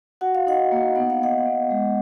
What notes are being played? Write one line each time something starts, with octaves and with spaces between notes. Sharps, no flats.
F#4 F#5
F5
D#4 D#5 F#5
A#3
B3 F#5
F5
B3 D#5 F#5
B3
G#3